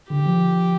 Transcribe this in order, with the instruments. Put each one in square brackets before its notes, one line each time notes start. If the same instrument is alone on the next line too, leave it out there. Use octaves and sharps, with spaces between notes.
[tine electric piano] D3 [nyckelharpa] G4
[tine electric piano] F3